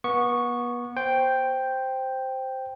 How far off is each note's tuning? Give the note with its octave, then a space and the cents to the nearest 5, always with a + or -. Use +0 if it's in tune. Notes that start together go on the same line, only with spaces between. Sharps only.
B3 -30 C#6 +0
C5 +0 G5 +0